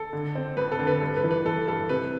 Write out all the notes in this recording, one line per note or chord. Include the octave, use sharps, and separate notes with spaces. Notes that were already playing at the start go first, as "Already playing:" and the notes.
Already playing: A4
D3
C4
F2 B4
A4
D3
B4
G2 A4
B4
E3
B4
E3 A4
G2 A4
C3 B4